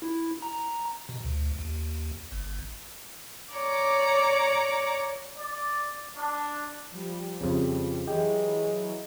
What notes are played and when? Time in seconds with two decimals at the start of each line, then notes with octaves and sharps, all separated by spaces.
0.02 E4
0.42 A#5
1.09 B2
1.25 D2
1.59 D#2
2.32 G1
3.54 C#5 D5 A#5 D6
5.37 D5
6.16 D4
6.91 F3 G3
7.41 F2 C#3
8.08 E3 F#3 G#3 G4